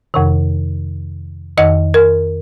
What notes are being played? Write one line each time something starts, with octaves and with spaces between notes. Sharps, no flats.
F2 C3 D#3
F2 D#3 D#5
A#4